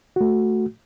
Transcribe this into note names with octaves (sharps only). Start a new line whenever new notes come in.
A3 F#4